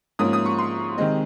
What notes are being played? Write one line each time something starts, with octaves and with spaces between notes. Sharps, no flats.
G#2 F3 A#3 C#4 D#6
D#6
C#6
C6
C3 D#3 G#3 C4 D#5